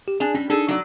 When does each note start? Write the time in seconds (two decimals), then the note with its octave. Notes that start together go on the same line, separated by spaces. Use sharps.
0.08 G4
0.20 D4 G#4 G#5
0.35 G3 C#4
0.50 D4 D#4 G#4 A4
0.68 F#3 D5